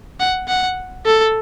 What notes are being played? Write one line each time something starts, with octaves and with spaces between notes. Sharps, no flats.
F#5
F#5
A4